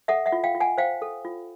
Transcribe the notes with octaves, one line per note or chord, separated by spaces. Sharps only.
A4 E5 F#5
E5 F#5
F4
F5 G5
F4
F#5 G#5
C5 F5 G5
A4
F4